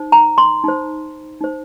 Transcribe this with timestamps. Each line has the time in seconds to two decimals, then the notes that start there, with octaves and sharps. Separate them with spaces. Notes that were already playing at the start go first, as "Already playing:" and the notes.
Already playing: D#4 C5
0.12 A#5
0.38 C6
0.64 D#4 C5
1.41 D#4 C5